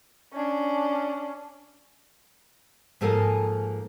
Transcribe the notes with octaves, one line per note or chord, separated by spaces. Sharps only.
C#4 D4
G#2 F3 A#3 A4 D#5 G#5